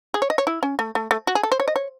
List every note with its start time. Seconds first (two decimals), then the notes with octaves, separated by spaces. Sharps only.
0.14 G#4
0.22 C#5
0.30 D#5
0.38 C#5
0.47 E4
0.63 C#4
0.79 A3
0.95 A3
1.11 A3
1.27 F#4
1.35 G#4
1.43 A4
1.52 C5
1.60 C#5
1.68 D#5
1.76 C#5